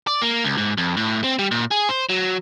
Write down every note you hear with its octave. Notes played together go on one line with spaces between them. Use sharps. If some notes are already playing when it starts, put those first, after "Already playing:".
D5
A#3
C#2
G#2
F2
A2
C4
G3
A#2
G#4
C5
F#3